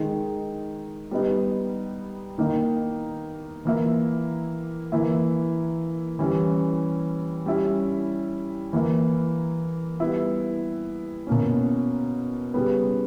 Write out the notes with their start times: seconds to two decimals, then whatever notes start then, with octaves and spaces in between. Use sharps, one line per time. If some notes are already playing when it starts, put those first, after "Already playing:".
Already playing: D#3 G#3 D#4
1.11 G3 B3 D#4
2.38 D#3 A#3 D#4
3.65 E3 A#3 E4
4.92 E3 A#3 E4
6.19 E3 G3 C#4
7.46 G3 C#4 E4
8.73 E3 A#3 E4
10.00 G3 B3 E4
11.27 B2 A#3 C#4
12.54 C#3 G3 B3